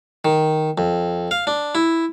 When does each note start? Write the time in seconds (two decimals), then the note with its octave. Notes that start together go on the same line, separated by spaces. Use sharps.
0.25 D#3
0.78 F2
1.31 F5
1.47 D4
1.75 E4